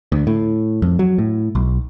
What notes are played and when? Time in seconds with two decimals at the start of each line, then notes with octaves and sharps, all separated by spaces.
0.12 D2
0.27 A2
0.82 F2
0.99 F#3
1.18 A2
1.55 B1